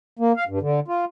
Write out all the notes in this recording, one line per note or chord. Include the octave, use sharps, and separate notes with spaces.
A#3
F5
G2
D3
F4